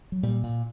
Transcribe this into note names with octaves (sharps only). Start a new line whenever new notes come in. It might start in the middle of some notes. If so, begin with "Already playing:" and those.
F#3
A#2 G3
A#2